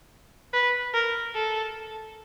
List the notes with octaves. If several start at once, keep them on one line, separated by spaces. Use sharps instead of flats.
B4
A#4
A4